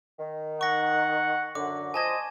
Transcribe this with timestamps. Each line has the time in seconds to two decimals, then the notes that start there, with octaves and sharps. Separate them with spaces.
0.19 D#3
0.61 F#5 C#6 A#6
1.55 F#2 D3 D6
1.94 F3 C5 D#5 G#5 A5 G#6